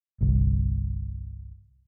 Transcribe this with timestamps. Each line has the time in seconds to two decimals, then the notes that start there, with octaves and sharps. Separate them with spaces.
0.21 G1 C2